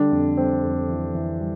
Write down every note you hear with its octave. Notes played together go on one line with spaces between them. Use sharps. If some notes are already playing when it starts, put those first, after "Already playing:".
Already playing: D3 G3 D4
F2
G3 C4
F2
E3
E3
G3